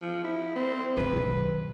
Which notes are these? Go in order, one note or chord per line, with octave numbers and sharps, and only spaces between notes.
F3
E4
C4
D3 B3 B4
B1 D#3